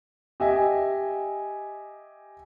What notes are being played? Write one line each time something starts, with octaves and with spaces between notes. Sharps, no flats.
G4 D#5 E5 G#5